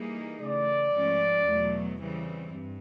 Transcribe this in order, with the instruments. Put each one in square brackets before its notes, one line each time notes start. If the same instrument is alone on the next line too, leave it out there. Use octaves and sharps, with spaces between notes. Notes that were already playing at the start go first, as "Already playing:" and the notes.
Already playing: [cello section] E3 G3 A#3 D#4 G#4
[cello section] C#3 E3 A3 [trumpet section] D5
[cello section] G#2 F3 A3 C#4 F4
E2 B2 F#3 A3
C#3 E3 G3 C4
G2